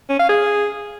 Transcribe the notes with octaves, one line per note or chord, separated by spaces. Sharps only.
C#4
F5
G#4